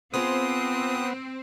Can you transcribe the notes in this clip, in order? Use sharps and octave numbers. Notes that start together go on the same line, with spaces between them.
B3 C4 F4 G#4 C5 D#6